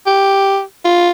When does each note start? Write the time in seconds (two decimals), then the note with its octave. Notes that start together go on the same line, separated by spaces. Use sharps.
0.07 G4
0.85 F4